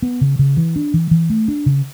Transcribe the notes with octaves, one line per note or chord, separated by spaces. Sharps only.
B3
C#3
C#3
E3
D4
E3
E3
A3
D4
C#3